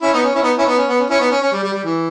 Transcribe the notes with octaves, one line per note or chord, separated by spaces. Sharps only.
C#4 E4
B3 D#4
C#4
C#4 E4
B3 D#4
C#4 E4
B3 D#4
C#4
B3
C#4
C#4 E4
B3 D#4
C#4
C#4
G3
G3
G3
E3